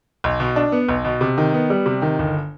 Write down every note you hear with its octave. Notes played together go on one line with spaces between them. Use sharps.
B1
B2
D4
B3
B1
B2
C3
D#3
B3
G3
C3
D#3
G1